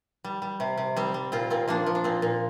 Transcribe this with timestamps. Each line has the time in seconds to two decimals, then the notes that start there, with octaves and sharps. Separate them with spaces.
0.24 G3
0.42 G3
0.60 C3
0.78 C3
0.96 G3 C4
1.14 G3
1.32 A#2 C4 F4
1.50 A#2 C4
1.68 F3 A#3 D4
1.86 F3
1.95 D4
2.04 A#2 C4
2.22 A#2